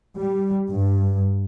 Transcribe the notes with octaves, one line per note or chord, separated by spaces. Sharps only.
G3
G2